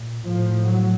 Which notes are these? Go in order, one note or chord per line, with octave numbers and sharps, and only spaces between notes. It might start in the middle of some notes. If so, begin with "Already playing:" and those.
Already playing: A#2
A2 F3
F#3